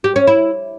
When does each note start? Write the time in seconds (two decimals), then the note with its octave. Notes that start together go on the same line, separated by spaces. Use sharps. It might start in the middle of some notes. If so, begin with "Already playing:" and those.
0.04 G4
0.16 C#4
0.27 E4